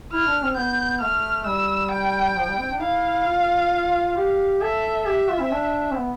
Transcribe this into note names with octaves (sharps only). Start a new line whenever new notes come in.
E4 F6
D4
C4
B3 G6
A3 F6
G3 E6
G5
F3
G3
C4
D4
E4 F5
F4
G4
A4 E5
G4 E5
F4
C4
D4
C4
B3